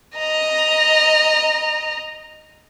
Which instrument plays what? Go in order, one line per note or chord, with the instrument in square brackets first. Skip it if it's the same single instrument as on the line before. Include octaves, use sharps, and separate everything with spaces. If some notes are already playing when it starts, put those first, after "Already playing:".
[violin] D#5 A#5